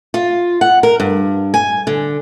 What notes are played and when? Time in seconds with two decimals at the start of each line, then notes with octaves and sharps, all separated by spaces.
0.14 F4
0.61 F#5
0.83 A#4
1.00 G2
1.54 G#5
1.87 D3